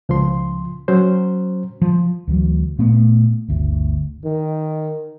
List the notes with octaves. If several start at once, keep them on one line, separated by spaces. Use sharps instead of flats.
C#2 F3 C6
F#3 C#4 C5
F3
D2 E3 F#3
A#2 A3 B3
G1 D2
D#3